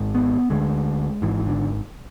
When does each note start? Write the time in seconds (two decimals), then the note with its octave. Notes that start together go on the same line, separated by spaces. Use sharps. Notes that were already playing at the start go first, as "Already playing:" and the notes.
Already playing: G#1 G#2
0.15 B3
0.50 D2 D3 G#3
1.22 G#1 G#2 E3
1.46 D3